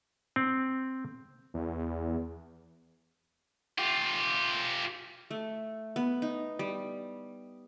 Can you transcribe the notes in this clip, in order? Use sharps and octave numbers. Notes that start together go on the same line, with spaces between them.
C4
E2
F4 G4
A3
B3
D#4
G3